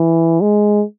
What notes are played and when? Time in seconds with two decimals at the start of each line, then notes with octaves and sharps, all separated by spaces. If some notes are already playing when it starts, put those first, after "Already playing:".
Already playing: E3
0.41 G#3